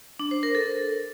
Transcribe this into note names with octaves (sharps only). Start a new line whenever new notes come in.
D4
C5
A#4
A4